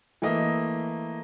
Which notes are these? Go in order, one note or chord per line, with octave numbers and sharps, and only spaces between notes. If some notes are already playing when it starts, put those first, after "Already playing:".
E3 A3 A#3 D#5 E5